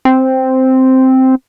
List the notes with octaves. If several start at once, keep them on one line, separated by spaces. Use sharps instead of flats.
C4